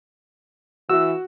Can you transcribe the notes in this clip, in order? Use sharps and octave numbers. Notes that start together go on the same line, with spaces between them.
E3 F#4 E6